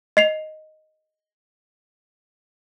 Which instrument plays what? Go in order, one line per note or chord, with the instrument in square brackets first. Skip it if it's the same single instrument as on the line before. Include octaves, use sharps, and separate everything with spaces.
[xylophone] D#5 C7 F7